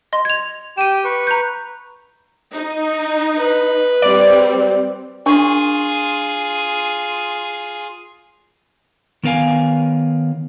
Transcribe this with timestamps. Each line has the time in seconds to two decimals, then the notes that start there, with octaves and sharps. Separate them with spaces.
0.13 D#5 C6
0.25 G#6 F7
0.78 G4 G5 D#7 E7
1.04 B4 C#6
1.27 A#5 G6
2.52 D#4
3.38 B4
4.02 G3 C4 D5
5.26 D4 F4 G#4 A#4 C#6
9.23 D#3 B3 A#4 F5 G#5